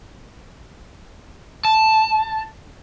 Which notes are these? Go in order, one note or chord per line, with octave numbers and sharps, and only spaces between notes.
A5